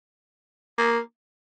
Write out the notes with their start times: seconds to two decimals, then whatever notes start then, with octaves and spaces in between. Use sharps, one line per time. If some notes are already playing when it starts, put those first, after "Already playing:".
0.78 A#3